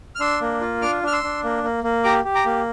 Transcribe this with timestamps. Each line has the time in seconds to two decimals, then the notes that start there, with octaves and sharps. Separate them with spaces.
0.15 F6
0.20 D4 C6 E6
0.41 A#3
0.61 F4
0.81 D4 D6 F6
1.03 D4 F6
1.12 C6 E6
1.23 D4
1.44 A#3
1.63 A#3
1.84 A#3
2.04 G4 A#5 D6
2.24 G4
2.35 A#5 D6
2.45 A#3